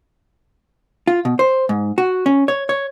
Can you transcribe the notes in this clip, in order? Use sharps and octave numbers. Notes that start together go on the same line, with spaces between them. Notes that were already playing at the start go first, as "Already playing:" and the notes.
F4
B2
C5
G#2
F#4
C#4
C#5
C#5